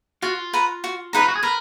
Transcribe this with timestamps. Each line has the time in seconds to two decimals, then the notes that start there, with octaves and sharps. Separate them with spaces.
0.22 F4 F#4
0.53 B4 F#5 A#5
0.84 F#4
1.13 D#4 B4 F#5 A#5
1.22 F4
1.28 F#4
1.35 G#4
1.43 A#4 B4